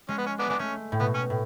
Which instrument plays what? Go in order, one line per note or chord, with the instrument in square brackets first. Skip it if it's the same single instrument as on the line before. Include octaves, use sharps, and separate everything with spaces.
[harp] G#3 [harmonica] C#4
[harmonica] B3
C#4
B3 D4
[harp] G#3 [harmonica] B3 D4
[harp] A3 [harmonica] C#4
[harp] A2
[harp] B2 [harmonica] B3
[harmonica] C#4
[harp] A2